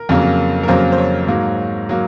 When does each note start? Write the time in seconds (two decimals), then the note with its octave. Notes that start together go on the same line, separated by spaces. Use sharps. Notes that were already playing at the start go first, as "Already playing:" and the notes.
Already playing: A#4
0.09 F2 C#3 F#3 A#3
0.63 A#4
0.68 F2 C#3 F#3 A#3 C5
0.92 C5
0.98 C#5
1.27 G#2 F#3 A#3
1.89 F#3 A#3